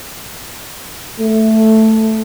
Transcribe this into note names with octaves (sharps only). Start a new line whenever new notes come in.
A3